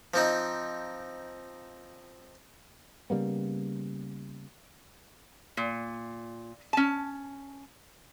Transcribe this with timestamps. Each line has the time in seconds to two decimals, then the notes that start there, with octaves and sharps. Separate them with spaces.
0.14 F3 C4 D#4
3.10 C#3 G3 A#3 B3
5.57 A#2
6.73 C#4 A5